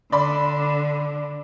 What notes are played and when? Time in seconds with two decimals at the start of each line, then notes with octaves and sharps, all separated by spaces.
0.12 D3 D5 B5 C6